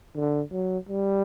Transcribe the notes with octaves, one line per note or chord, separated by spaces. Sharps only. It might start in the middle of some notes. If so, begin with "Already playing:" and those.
D3
F#3
G3